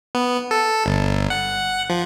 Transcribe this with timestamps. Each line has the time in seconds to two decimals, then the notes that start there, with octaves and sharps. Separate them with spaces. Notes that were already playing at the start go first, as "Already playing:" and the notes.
0.15 B3
0.51 A4
0.86 G1
1.30 F#5
1.90 F3